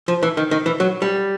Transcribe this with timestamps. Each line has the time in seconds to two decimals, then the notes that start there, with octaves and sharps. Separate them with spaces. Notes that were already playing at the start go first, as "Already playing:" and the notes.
0.08 F3
0.23 E3
0.37 D#3
0.51 D#3
0.66 E3
0.80 F#3
1.02 G3